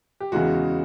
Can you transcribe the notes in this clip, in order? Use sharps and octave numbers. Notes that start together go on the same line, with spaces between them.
G4
E2 C#3 E3 G#3 F#4